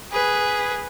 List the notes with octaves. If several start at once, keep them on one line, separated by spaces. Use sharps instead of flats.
G#4 B4